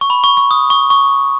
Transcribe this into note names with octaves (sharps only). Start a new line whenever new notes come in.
C#6
B5
C#6
C#6
D#6
C#6
C#6